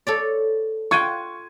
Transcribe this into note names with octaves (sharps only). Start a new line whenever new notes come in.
A4 C#5 D5
F4 F#5 G5 C#6 G#6 D#7